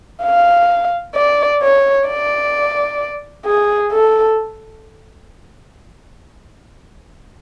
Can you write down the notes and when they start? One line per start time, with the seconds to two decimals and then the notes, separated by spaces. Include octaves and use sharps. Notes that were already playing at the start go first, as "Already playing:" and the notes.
0.23 F5
1.15 D5
1.62 C#5
2.08 D5
3.46 G#4
3.92 A4